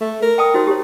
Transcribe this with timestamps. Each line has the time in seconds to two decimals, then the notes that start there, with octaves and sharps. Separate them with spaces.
0.01 A3
0.22 A#4
0.38 G5 A5 D#6
0.54 D#4 F#4 C5
0.67 G4 C#5